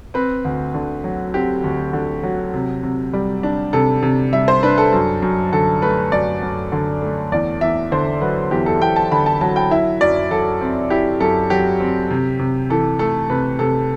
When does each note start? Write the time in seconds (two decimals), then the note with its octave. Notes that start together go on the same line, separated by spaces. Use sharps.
0.14 C4 B4
0.45 D2
0.74 D3
1.04 F#3
1.34 C4 G4
1.64 D2
1.93 D3
2.23 F#3
2.54 C3
2.83 C3
3.13 G3
3.43 D4
3.73 C3 A4
4.03 C3
4.33 G3 E5
4.48 C5
4.63 D4 B4
4.78 A4
4.93 F#2
5.22 F#2
5.52 D3 A4
5.82 A3 B4
6.12 F#2 D5
6.42 F#2
6.72 D3
7.02 A3
7.32 E2 D5
7.61 E2 E5
7.92 D3 C5
8.21 F#3 B4
8.51 E2 G4
8.66 A4
8.81 E2 G5
8.96 A5
9.11 D3 B5
9.26 A5
9.41 F#3 A5
9.56 G5
9.71 E4 E5
10.01 F#2 D5
10.31 F#3 A4
10.61 C4
10.90 E4 G4
11.20 F#2 A4
11.50 F#3 G4
11.80 C4
12.11 C3
12.39 C3
12.70 E3 A4
12.99 A3 A4
13.30 C3 B4
13.59 C3 A4